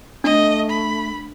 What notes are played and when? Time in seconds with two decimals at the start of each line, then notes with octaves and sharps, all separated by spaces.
0.24 A3 D4 D#5
0.70 B5